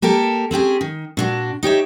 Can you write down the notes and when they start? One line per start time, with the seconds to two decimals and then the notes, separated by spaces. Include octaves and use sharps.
0.02 A#3 G4 A4 A#4
0.51 C4 C#4 G4 G#4
0.81 D#3
1.17 A#2 D4 F#4
1.63 D#4 G4 C#5 E5